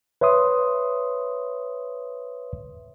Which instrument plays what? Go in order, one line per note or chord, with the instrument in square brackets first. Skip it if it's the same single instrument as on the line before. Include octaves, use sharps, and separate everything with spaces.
[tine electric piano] B4 C#5 E5 C6 D#6